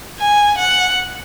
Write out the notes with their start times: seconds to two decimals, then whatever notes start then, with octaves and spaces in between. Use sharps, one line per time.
0.19 G#5
0.58 F#5